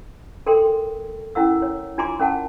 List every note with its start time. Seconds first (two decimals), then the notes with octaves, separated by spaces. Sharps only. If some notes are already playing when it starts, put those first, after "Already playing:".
0.46 D4 A4 A#4 G5 C6
1.35 C#4 E4 A#4 F#5 E6
1.62 C#5
1.98 D4 F4 G#5 A#5 C6 D6
2.20 C#4 A#4 F#5 A5